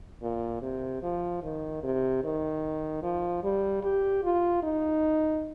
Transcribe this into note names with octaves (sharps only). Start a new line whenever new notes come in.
A#2
C3
F3
D#3
C3
D#3
F3
G3
G4
F4
D#4